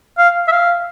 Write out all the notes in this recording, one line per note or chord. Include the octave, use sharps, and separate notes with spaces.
F5
E5
F5